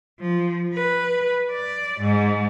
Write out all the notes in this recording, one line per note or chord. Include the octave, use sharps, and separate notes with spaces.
F3
B4
D5
G#2